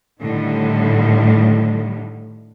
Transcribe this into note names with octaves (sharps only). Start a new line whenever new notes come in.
A2 D3 D#3 G3